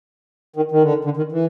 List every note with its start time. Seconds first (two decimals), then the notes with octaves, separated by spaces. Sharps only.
0.56 D#3
0.71 D#3
0.82 D3
1.05 D3
1.17 D#3
1.32 E3